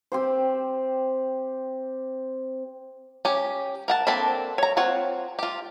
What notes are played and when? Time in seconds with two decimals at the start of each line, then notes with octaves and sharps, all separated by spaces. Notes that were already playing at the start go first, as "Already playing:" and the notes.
0.12 C4 G4 C5
3.25 C#4 G4
3.88 A#4 F#5 A5
4.07 A#3 C4 D4 A4 B5
4.58 C#5 A#5
4.77 C4 F4 C#5 F#5
5.39 F4 G4